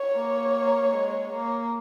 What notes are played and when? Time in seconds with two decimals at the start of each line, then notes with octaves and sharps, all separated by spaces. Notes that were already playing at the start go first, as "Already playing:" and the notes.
Already playing: C#5
0.13 A#3
0.92 G#3
1.32 A#3